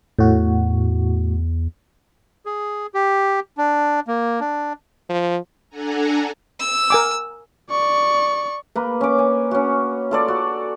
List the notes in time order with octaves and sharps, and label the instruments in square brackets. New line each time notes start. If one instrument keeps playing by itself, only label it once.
[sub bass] E2 [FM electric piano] A2 F#4
[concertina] G#4
G4
D4
A#3
D4
[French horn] F3
[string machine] D4 A4 F#5 G#5 A#5
[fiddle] E6
[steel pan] A#4 G#5 D6
[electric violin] D5 C#6
[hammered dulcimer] A#3 B4
C#4 D6
G#5
C#4 F#4
F4 A4 D5
F#4